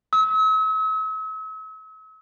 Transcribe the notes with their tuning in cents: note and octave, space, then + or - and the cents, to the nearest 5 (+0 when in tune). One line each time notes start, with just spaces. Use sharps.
E6 -45